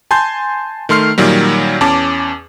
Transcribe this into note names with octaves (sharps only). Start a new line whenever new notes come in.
G#5 A5 C6 G6
D#3 A3 C6 F6 C7
A#2 D#3 F#3 G3
E2 C#4 A5 D6